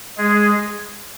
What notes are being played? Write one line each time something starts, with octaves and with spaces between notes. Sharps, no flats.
G#3 G#4